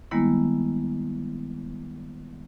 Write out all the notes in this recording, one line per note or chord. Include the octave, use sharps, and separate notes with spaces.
D#3 G3 G#3 A#3 B3 E4